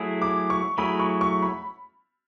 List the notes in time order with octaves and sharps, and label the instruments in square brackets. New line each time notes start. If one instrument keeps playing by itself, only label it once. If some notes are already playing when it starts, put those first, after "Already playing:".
Already playing: [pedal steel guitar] F#3 A3 E4 G#4
[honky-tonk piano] D6
C#6
[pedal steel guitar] F#3 A3 E4 G#4 [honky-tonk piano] B5
[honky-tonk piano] C#6
C#6
B5